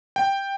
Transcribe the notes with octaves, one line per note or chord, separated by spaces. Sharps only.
G5